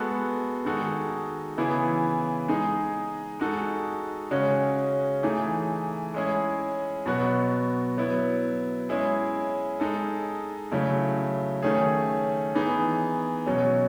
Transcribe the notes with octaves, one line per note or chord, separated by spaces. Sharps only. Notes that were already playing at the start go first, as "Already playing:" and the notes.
Already playing: G#3 B3 F#4 A4
D#3 G#3 D#4 F#4 A4
C#3 E3 B3 E4 G#4
G#3 D#4 G#4
G#3 D#4 F#4 A4
C#3 G#3 C#4 F#4
E3 A3 D#4 G#4
G#3 C#4 E4 G#4
B2 F#3 B3 F#4
F#3 B3 E4
G#3 C#4 E4 G#4
G#3 D#4 A4
C#3 F#3 A3 E4
D#3 A3 C#4 G#4
E3 B3 D#4 G#4
B2 F#3 C#4